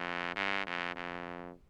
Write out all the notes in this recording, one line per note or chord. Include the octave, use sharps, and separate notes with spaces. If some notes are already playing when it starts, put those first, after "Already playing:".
Already playing: F2
G2
F2
F2